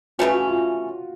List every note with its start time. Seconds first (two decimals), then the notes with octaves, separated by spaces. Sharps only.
0.19 C#3 E3 A3 C#4 F#4
0.33 F#4
0.48 F4